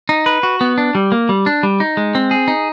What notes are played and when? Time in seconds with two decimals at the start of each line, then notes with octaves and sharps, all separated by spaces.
0.09 D#4
0.26 B4
0.43 F#4
0.61 B3
0.78 D4
0.95 G3
1.12 A#3
1.29 G3
1.46 D4
1.63 G3
1.80 D#4
1.97 G#3
2.15 C4
2.31 G#4
2.48 D#4